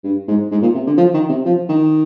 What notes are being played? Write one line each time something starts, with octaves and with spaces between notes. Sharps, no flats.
G2
G#2
G#2
A#2
C3
D3
F3
D#3
C3
F3
D#3